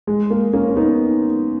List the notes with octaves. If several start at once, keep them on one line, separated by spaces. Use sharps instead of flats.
G#3
A#3
A#3 C#4
C#4
B3 D#4